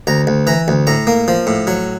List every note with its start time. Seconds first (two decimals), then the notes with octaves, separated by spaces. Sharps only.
0.07 D2 A#5
0.27 D2
0.47 E3 A#5
0.68 D2
0.87 A2 A#5
1.07 A#3
1.28 F3
1.47 A2
1.67 F#3